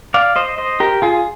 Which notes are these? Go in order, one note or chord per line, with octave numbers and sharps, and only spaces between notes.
D5 F5
C5 D#5
C5 D#5
G4 A#4
F4 G#4